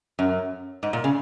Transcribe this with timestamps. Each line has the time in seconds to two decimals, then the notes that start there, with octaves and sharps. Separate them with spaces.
0.19 F#2
0.83 G#2
0.93 A#2
1.04 C#3